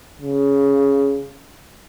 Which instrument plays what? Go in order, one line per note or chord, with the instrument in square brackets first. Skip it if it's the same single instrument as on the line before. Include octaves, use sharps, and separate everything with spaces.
[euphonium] C#3